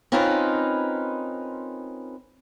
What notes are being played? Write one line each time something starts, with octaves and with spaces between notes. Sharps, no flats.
C4 C#4 D#4 F4 A#4 B4